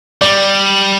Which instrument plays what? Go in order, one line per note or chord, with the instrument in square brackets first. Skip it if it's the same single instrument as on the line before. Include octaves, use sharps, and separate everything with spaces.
[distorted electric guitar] G3 [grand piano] D5